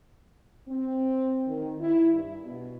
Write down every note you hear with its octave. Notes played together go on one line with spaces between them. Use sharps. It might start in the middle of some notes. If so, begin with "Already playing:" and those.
C4
D#3
E4
G2
B2